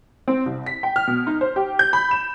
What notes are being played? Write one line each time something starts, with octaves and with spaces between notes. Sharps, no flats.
C4
C2
B6
G5
F6
B2
D#4
C5
G4
G6
B5
E7